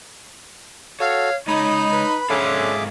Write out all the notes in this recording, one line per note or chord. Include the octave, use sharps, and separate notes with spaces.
F#4 A4 C#5 F5
G#3 D#4 C#5 D#5 B5 D#6
B4
G#2 D3 C#4 G#4 A4 E5 F5 D6